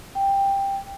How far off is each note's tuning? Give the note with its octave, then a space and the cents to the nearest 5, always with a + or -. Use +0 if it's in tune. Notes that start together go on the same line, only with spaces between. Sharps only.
G5 +10